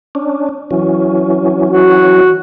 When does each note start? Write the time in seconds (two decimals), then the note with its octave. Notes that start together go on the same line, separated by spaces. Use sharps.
0.15 C#4 D4
0.71 E3 F#3 C#4
1.70 F#4